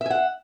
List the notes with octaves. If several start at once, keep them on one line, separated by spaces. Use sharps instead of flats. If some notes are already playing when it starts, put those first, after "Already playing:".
E5 F#5 G#5